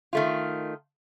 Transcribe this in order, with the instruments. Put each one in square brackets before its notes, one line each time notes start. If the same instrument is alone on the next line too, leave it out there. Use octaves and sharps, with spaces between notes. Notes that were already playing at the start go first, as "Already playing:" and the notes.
[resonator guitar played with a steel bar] D#3 A3 F4